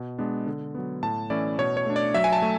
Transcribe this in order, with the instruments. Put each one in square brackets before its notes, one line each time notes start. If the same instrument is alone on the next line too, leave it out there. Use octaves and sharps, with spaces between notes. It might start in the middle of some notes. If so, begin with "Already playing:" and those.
Already playing: [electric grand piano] B2
G#3 B3 D4
D3
F#3 B3
A2 A5
E3 A3 C#4 E4 D5
B2 C#5
C#5
A3 D4
D5
F#3 E5
G#5
A5
A3